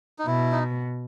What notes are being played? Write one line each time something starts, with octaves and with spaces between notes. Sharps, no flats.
D#4
B2 E4
D#4